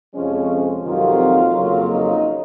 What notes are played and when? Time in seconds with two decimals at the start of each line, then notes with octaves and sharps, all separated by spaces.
0.14 F2 C3 F3 G#3 C#4
0.83 F2 C3 D#3 F#3 A#3 F4
1.53 F2 C#3 F#3 A#3
1.87 D#4